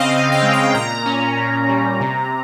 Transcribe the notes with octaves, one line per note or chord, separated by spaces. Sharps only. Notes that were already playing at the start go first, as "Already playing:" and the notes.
Already playing: C#3 C4 D#5 F5
C#3 F5
G5
G#3
G5
A#2 A#5
C#4
A#2
G3
C3